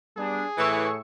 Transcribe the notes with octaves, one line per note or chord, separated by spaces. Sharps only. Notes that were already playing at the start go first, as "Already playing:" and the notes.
G3 B3 D4 G#4
A2 E3 C#6 E6 C#7